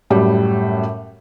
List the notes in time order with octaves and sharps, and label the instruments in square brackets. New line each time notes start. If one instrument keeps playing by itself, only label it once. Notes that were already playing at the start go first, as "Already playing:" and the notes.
[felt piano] F#2 A2 G3